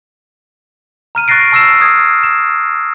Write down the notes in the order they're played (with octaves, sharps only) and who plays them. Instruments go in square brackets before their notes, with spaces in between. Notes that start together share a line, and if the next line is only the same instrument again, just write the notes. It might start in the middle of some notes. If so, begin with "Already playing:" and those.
[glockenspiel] A#5 F6 D#7
C#6 F#6 A6 A#6 C7 D7
A5 C#6 E6 A#6 C7 E7
D#6 F6 G#6
E7